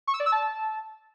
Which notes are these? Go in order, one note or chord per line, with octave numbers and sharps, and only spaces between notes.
C#6
E6
D5
E6
A5